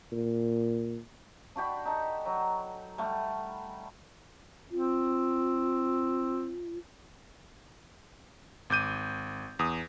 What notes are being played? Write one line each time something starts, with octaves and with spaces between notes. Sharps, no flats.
A#2
D4 F#4 G4 B5
D#4 A4
F#3
G3 A3 F#5
C4 F4
G#1 D6 G6 D#7
E2 D#6